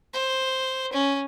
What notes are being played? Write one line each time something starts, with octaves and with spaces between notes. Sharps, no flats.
C5
C#4